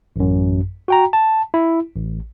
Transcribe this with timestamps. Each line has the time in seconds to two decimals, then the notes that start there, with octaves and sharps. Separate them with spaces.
0.16 A1 F#2
0.88 F#4 G5 A#5
1.13 A5
1.54 E4
1.96 A1